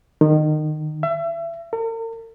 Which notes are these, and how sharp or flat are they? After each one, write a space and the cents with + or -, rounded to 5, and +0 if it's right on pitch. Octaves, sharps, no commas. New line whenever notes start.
D#3 -25
E5 +30
A#4 -45